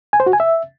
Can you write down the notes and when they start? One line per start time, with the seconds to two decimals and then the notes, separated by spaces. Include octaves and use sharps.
0.13 G#5
0.20 C5
0.26 F#4
0.33 G#5
0.40 E5